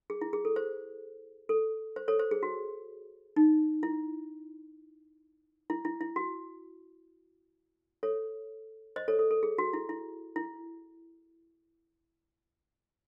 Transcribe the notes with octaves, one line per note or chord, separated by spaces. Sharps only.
G#4
E4
G#4
A4
C5
A4
C5
A4 C#5
C5
G#4
F#4
D#4
E4
E4
E4
E4
F#4
A4 C#5
C5 D#5
A4 C#5
A4
A4
G#4
F#4
E4
E4
E4